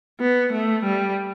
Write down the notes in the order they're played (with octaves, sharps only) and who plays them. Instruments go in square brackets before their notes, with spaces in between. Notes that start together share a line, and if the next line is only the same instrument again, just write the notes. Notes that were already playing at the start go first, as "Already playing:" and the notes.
[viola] B3
A3
G3